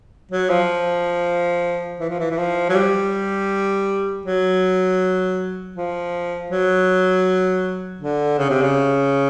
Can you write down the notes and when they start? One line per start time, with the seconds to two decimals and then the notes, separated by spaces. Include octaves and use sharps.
0.31 F#3
0.50 F3
2.00 E3
2.10 F3
2.20 E3
2.31 E3
2.38 F3
2.69 F#3
2.75 G3
4.26 F#3
5.76 F3
6.50 F#3
8.01 D3
8.38 C#3
8.50 C3
8.62 C#3